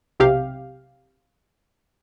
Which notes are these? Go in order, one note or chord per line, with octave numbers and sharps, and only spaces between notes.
B1 C3 G4 F5